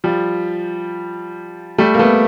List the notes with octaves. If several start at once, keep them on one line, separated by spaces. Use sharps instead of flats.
F3 G3
G3 A3
A#3
A3 B3